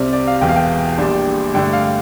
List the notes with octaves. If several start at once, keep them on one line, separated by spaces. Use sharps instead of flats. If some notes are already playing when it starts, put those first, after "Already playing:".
Already playing: C2 C3 G3 C4 D5
D5
F5
E1 E2 E3 G5
F5
G5
A#1 A#2 G3 D4
G2 D3 A3 D4 G5
F5